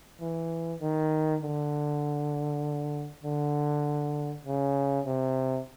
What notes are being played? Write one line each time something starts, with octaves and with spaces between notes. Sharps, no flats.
E3
D#3
D3
D3
C#3
C3